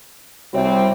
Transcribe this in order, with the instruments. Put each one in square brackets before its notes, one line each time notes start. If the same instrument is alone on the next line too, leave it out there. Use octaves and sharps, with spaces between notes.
[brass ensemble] C2 G3 C4 [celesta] F#4 C#5 E5